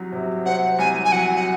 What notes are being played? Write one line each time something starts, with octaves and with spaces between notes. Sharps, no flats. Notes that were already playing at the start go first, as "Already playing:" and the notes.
Already playing: C2 F#3
C3
C4 F#5
C2 G#5
G#5
F#3 F#5
F#5